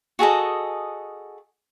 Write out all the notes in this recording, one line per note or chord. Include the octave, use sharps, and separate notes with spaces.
F#4 G#4 A4 D#5